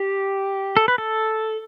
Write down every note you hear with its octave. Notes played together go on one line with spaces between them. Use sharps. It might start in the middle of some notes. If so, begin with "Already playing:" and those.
Already playing: G4
A4
B4
A4